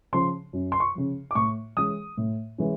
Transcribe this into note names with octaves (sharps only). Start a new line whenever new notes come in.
C#3 F3 C6
F#2
C6
C#6
C#3 F3
D6
A2 C#6
E3 G#3 C#4 D#6
A2
E3 G#3 C#4